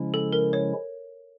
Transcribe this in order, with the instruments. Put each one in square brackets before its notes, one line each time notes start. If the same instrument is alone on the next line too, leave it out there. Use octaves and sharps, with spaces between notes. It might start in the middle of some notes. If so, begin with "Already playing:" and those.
Already playing: [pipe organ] C#3 F3 G#3 C#4 E4
[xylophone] A4
A#4
C#5